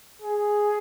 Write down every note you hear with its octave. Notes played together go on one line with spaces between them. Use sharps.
G#4